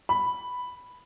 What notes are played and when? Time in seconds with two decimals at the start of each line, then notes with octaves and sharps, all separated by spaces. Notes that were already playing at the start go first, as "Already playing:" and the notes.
0.09 B5